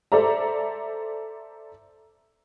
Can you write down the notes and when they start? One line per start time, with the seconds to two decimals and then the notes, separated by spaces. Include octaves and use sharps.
0.12 A4 C5 D5 E5 A#5